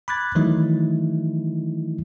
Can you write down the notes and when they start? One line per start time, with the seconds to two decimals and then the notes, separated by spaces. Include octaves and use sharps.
0.08 B5 D6 F#6 G#6 A6
0.35 D#3 E3 F#3 A3 D#4 E4